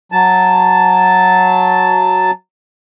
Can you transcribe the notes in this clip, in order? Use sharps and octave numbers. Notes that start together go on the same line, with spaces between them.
F#3 A5